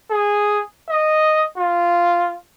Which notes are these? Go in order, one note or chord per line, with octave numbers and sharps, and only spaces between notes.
G#4
D#5
F4